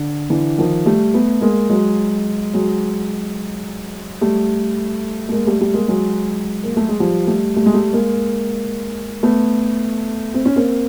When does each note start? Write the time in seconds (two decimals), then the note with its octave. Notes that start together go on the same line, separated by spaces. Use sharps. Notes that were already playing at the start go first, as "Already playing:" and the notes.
Already playing: D3
0.30 D3 E3
0.58 D#3 F3
0.86 G3 A3
1.14 A3 B3
1.41 G#3 A#3
1.69 F#3 G#3
2.54 F#3 G#3
4.21 G3 A3
5.29 A3
5.32 G#3 A#3
5.47 G3 A3
5.61 G3 A3
5.74 G#3 A#3
5.88 F#3 G#3
6.64 A#3
6.77 A3
6.89 G#3
7.00 F3 G3
7.27 G3 A3
7.56 G3 A3
7.66 G#3
7.74 G3 A3
7.93 G#3 A#3
9.23 A3 B3
10.34 C4
10.45 C#4
10.56 A#3 C4